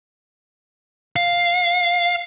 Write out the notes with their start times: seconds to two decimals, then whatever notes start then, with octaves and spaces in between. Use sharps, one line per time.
1.16 F5